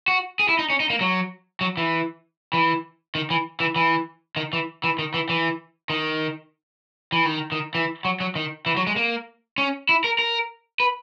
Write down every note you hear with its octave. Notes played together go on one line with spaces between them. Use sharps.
F#4
G#4
E4
D#4
C#4
D#4
A#3
F#3
F#3
E3
E3
D#3
E3
E3
E3
D#3
E3
E3
D#3
E3
E3
D#3
E3
D#3
D#3
E3
F#3
F#3
D#3
E3
F#3
G#3
A#3
C#4
E4
A#4
A#4
B4